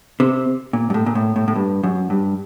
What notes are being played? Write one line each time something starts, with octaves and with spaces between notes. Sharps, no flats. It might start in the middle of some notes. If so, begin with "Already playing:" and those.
C3
A#2
G2
A2
A#2
A2
A2
A2
G2
F#2
G2